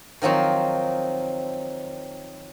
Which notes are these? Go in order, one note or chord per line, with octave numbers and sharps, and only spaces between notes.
D#3 F3 F#3 C4 D#4